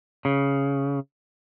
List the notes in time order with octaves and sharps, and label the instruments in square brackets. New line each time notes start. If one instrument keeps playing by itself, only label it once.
[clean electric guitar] C#3